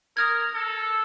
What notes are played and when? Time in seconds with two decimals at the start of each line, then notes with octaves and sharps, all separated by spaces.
0.17 A#4 D#6 F6 G#6
0.54 A4